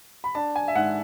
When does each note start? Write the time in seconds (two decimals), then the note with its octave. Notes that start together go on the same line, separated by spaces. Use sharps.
0.24 B5
0.35 D4 A5
0.56 G#5
0.68 E5
0.75 G#2 F#5